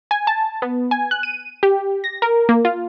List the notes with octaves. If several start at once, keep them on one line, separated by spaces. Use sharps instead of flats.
G#5
A5
B3
G#5
F#6
D#7
G4
A#6
A#4
A#3
F4